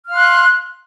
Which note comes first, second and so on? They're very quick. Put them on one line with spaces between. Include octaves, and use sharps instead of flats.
F6 F5 C6 F#6